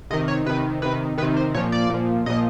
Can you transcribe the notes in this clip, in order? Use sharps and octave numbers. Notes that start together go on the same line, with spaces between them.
C3 D#3 D#5
C#5
C3 D#3 B4
C3 D#3 B4
C3 D#3 B4
C5
A#2 F3 C#5
D5
A#2 F3
A#2 F3 D#5